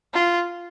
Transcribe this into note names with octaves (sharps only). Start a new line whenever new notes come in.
F4